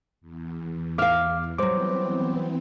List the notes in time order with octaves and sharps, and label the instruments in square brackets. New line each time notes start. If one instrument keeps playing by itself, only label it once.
[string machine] E2
[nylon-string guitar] E5 F5 [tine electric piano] D6 F6
[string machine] E3 B3 C4 [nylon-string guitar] F#3 G3 [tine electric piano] C5 D6